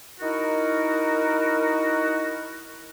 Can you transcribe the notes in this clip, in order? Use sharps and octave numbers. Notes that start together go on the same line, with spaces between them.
D#4 E4 F#4 A#4